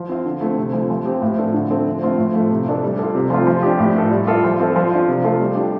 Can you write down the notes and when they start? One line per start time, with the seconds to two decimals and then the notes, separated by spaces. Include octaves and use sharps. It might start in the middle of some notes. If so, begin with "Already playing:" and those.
Already playing: F3
0.09 C4 F4
0.25 D3
0.41 A3 C4
0.57 C3
0.73 F3 A3
0.90 F3
1.06 C4 G4
1.22 A2
1.38 A3 D4 F4 A4
1.54 D3
1.70 F3 C4 A4
1.86 F3
2.02 A3 C4 F4
2.18 A2
2.34 F3 A3
2.51 C3
2.66 A3 D4 A4
2.83 G3
2.99 F4 A4
3.15 C3
3.30 F3 A3 C4 F4
3.47 F3
3.63 D4 G4
3.79 A2
3.95 A3 F4 A4
4.11 G3
4.27 F4 A4
4.44 F3
4.59 C4 F4 A4
4.76 F3
4.92 D4 F4
5.08 C3
5.24 A3 F4 A4
5.39 G3
5.55 D4 G4